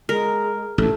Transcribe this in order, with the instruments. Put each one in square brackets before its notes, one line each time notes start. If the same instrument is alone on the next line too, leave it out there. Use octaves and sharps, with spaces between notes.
[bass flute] G#3 [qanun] A#4
[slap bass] A1 D2 [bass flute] A3 [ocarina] A4